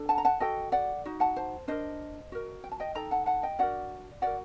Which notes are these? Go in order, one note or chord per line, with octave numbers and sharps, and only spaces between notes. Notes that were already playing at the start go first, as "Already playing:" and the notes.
Already playing: D4 A4
F#5 A5
A#5
F#5 A5
F#4 A4 D#5 G5
D5 F#5
D#4 F#4
F#5 A5
C5
D4 G4 A#4 C5 D#5
F#4 A#4
G5
A5
D#5 G5
D#4 A4 G5 A#5
F#5 A5
F#5 A5
D#5 G5
D4 F#4 A#4 D5 F#5
F#4 A#4 D5 F#5